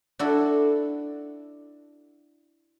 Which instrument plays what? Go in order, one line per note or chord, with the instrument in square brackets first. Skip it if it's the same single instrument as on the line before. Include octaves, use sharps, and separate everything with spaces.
[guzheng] D4 E4 F#4 A4